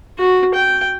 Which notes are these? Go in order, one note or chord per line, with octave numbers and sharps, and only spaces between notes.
F#4
G5